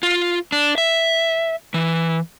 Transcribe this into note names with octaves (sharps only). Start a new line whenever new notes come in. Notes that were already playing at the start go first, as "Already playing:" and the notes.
F4
D4
E5
E3